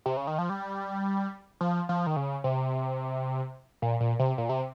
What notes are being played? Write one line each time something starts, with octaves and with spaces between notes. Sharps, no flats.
C3
C#3
D#3
F3
G3
F3
F3
D#3
C#3
C3
A#2
A#2
C3
A#2
C3